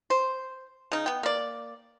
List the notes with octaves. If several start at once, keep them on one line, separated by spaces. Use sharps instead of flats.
C5
C#3 D#4
B3 G5
A#3 D5